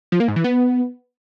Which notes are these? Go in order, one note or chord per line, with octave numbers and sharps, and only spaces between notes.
F3
A#3
G#2
E3
B3